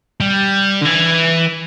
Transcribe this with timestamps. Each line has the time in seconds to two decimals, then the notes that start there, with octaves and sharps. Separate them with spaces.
0.21 G3
0.82 D3
0.86 E3